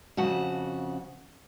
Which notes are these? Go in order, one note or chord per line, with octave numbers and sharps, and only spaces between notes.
F2 C#3 F#4 A5